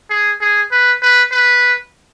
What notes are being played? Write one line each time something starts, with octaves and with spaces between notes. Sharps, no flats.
G#4
G#4
B4
B4
B4